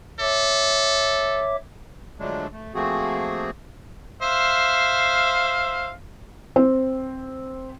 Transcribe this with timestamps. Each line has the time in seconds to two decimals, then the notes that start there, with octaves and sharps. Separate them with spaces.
0.19 A4 C#5 E5 D6
2.19 D3 F3 F#3 G#3 A3 D4
2.52 A3
2.75 F3 A3 A#3 C4 F#4 G#4
4.22 C5 E5 F5
6.56 C4